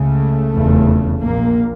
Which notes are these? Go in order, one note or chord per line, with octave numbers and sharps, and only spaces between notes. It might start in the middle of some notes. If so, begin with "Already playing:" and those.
Already playing: C#2 C#3 A3
F1 E2 C#3
A#1 A#2 A#3